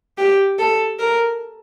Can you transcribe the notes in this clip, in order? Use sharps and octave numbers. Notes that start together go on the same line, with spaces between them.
G4
A4
A#4